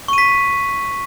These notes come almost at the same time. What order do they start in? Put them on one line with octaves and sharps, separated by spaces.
C#6 D#7 B6